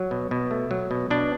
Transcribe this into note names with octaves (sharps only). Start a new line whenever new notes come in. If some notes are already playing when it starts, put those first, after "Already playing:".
Already playing: F#3
B2
B2
A3
F#3
B2
B2 D4